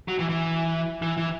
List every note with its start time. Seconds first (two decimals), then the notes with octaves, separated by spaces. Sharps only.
0.08 F#3
0.19 E3
0.29 E3
1.02 E3
1.17 E3